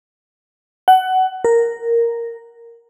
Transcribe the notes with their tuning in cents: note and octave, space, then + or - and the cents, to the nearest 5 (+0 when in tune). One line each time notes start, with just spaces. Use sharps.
F#5 +20
A#4 -5